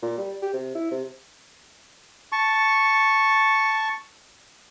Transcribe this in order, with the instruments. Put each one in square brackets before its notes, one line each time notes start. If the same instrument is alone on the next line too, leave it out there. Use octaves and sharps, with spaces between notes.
[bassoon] A#2
G3
G4
C3
E4
C3
[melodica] A5 C#6